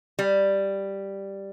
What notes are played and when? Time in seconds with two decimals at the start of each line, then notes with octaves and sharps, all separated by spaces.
0.19 G3